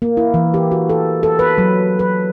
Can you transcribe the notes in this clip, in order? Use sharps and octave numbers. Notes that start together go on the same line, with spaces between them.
A#3
E4
E3
G4
F#4
A4
A4
B4
F#3
B4